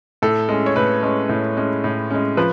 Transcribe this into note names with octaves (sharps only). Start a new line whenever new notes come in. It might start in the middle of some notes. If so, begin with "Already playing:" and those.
A2 A4
G#3 C#4
C#5
A2 B4
G#3 C#4
A2
G#3 C#4
A2
G#3 C#4
F3 B4